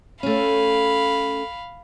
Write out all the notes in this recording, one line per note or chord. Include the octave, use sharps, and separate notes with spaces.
A3 C#4 F5 B5